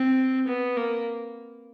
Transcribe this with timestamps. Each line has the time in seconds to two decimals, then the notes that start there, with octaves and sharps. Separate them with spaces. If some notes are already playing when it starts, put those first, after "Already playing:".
Already playing: C4
0.47 B3
0.77 A#3